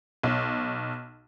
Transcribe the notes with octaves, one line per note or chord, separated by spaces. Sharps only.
B1